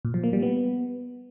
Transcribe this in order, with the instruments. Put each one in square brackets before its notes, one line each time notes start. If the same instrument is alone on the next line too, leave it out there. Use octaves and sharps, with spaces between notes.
[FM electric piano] A#2
F3
A#3
G3
B3